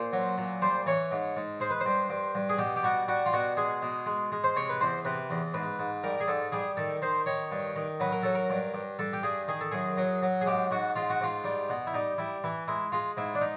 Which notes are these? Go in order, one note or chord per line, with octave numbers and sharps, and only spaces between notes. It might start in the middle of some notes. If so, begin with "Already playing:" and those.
Already playing: A#2 C5
F#3
A#2
G3 C5
E3 C#5
G#2
G#2
G#3 C5
B4
C5
G2
G2
G2
G#4
B2 G4
G4
G3 F#4
G3 F#4
F4
B2 F#4
G#3 G#4
B2
G#3
G#3
C5
C3 C#5
B4
E2 C5
C3 B4
E2
G#2 B4
G#2
G3 A#4
G#4
G#2 A4
G3 G#4
D#3 A4
D#3 C5
D#3 C#5
G2
D#3
F#3 B4
A#4
F#3 A4
A#4
G2
G2
G2 A4
G4
G2 G#4
D#3 G#4
A4
F#2 G#4
F#3
F#3
G#4
G#2 G4
G#2 F#4
G#2 F4
F#4
G#2 F4
G3
B2
E4
G3 D#4
G3 E4
E3 E4
G#3 E4
G#3 F4
G#2 E4
D4
D#4